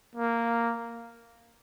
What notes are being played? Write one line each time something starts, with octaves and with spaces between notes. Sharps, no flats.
A#3